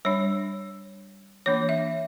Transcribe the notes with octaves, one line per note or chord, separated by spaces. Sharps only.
G3 D4 C#5
E3 A#3 D4 C#5
E5